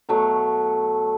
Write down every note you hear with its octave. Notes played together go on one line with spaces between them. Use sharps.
B2 F#3 A3